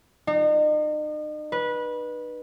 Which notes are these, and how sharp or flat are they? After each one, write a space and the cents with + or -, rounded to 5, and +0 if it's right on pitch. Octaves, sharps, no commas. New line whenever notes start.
D#4 -40
B4 -20